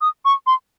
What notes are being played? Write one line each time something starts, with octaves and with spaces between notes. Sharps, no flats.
D#6
C#6
C6